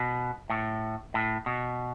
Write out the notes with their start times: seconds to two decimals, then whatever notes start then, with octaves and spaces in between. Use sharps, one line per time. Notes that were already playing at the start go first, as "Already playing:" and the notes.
Already playing: B2
0.50 A2
1.14 A2
1.46 B2